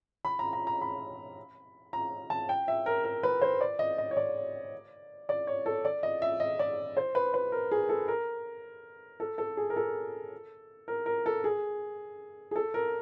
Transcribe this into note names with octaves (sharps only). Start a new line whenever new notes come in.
B5
A#5
A#5
A#5
B5
A#5
A5
G5
E5
A#4
A#4
B4
C5
D5
D#5
D#5
C#5
D5
D5
C#5
A4
D5
D#5
E5
D#5
D5
C5
B4
B4
A#4
G#4
A4
A#4
A4
A4
G#4
A#4
A4
A#4
A#4
A4
G#4
G#4
A4
A#4